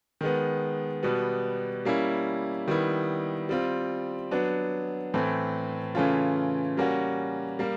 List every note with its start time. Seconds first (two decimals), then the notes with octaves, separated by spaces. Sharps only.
0.21 D#3 G#3 B3
1.03 B2 G3 B3
1.85 G3 A#3 C#4 E4
2.68 D#3 G3 B3 E4
3.49 G3 C4 F4
4.31 F#3 B3 D4
5.14 A2 E3 A3 C4
5.95 C#3 E3 A3 C#4 F4
6.77 G3 A#3 C#4 F#4
7.59 G3 A#3